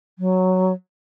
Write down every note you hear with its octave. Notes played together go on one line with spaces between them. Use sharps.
F#3